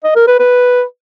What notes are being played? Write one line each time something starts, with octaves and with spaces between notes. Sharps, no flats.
D#5
A#4
B4
B4